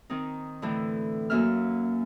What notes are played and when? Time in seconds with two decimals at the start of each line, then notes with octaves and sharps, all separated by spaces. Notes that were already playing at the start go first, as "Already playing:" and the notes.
0.10 D#3 C4 D#4
0.62 A2 D3 E3 A3
1.30 F#2 A#3 C#4 E5 F6